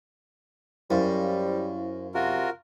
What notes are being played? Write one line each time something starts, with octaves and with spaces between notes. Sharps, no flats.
F#2 G3 E4 C5 F5
C3 F4 F#4 A#4